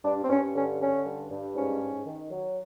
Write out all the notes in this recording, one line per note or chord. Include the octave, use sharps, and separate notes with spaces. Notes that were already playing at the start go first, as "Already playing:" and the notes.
G2 D4
C4
G2 C#4
D3 C#4
D3 C#4
G2
G2
G#2 C#4
G#2
D#3
F#3